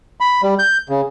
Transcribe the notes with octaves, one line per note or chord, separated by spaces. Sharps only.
B5
G3
G6
C#3